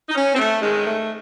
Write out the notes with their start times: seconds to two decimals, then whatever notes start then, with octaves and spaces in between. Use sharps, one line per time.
0.09 D#4
0.15 C#4
0.35 C4
0.38 A3
0.61 G#2 D#3 G#3
0.85 A3